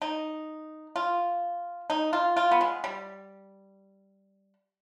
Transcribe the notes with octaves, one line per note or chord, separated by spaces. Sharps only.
D#4
F4
D#4
F4
F4
B3
G#3
G3